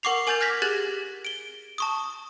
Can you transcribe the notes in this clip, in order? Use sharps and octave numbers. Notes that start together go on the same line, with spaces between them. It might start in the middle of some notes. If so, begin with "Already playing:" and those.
A#4 F#5 C#6 D6 C7 F7
A#4 G#5 D6 G6 A6 F7
F6 G#6 A#6 B6
G4 G#4 F#6 G#6 A6 F#7
D7 G7
A5 C#6 D#6